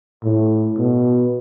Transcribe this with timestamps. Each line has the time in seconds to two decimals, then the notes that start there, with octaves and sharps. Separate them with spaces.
0.24 A2
0.78 B2